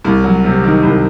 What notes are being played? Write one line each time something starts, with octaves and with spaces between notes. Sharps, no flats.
C2
F#3
C3
D#3
C2